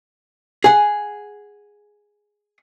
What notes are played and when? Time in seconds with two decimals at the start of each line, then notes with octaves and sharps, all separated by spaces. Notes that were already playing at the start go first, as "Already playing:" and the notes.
0.64 G#4 F#5